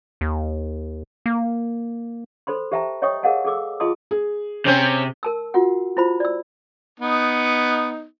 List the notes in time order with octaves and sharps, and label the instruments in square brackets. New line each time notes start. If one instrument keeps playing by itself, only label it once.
[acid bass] D#2
A#3
[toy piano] A4 C5 B5 C6
G4 C5 E5 G5 A5 A#5
C#5 D#5 G5 C#6 D#6
G#4 A#4 D#5 F5 F#5 G#5
G#4 A4 D6 E6
F4 G#4 D#5 A5 C6 D#6
[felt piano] G#4
[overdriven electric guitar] C3 [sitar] C4 C#4 C5
[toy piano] A#4 A5 E6
F4 F#4 F#5
E4 F4 C5 B5
D5 E6
[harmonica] B3 D#4